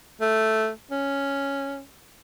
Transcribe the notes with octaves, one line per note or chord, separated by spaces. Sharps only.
A3
C#4